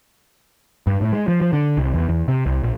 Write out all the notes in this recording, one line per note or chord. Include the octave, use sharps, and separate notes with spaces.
G2
A2
G#3
F3
F3
D3
C2
E2
E2
C3
C2
A#1